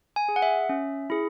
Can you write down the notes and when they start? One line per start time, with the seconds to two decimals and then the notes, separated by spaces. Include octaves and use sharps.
0.16 G#5
0.29 G#4
0.36 F#5
0.42 E5
0.69 C#4
1.10 E4 G#4